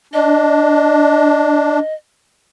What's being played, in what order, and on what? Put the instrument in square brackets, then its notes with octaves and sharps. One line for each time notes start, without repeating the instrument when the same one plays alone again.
[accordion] D4 [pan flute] D#5